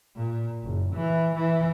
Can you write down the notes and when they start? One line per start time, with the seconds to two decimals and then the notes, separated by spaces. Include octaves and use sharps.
0.17 A#2
0.63 F#1
0.94 E3
1.36 E3